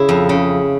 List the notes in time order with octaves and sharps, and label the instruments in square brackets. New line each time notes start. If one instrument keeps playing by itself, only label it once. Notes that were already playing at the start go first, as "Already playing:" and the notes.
Already playing: [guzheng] C#3 E4
F2
C#3